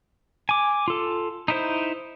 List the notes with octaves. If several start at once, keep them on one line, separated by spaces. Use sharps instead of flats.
G#5 D6
F4 A4
D#4 E4 C5